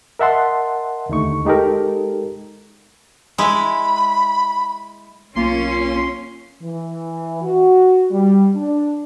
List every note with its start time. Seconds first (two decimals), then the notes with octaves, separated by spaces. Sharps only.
0.19 A#4 D#5 E5 F#5 A5 C6
1.09 D#2 D3 A3 D#4 C#6
1.45 G#3 D#4 G4 A4 A#4
3.38 G#3 E4 B5
5.35 B1 A#3 C#4 F4 C6
6.61 E3
7.42 F#4
8.10 G3
8.55 D4